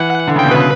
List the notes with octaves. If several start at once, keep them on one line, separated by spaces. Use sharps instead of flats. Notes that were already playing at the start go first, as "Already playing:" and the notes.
Already playing: E3 F#5
D3
C#3
G5
B2
C#3 B4